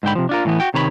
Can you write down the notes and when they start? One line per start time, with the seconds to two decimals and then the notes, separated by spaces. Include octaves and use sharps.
0.03 G#2 D3 G5 B5
0.15 C3 F3
0.29 D4 F4 A#4
0.45 A2 E3 B3
0.60 F#4 G5
0.74 C3 D#3 C#5 A#5 B5